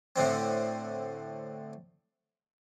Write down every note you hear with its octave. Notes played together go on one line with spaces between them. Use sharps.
A2 D3 C4